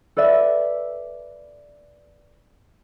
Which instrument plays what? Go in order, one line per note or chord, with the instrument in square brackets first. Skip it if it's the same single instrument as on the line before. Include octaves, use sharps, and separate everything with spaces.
[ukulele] A4 B4 D5 E5